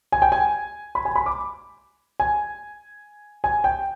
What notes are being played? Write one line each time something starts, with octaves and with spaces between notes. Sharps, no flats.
G#5
G5
G#5
B5
G#5
B5
D6
G#5
G#5
G5